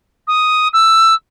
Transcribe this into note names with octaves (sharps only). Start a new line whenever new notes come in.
D#6
E6